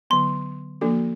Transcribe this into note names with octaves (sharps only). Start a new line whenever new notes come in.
D3 F#3 B3 C6
F3 A#3 D4 F#4 A4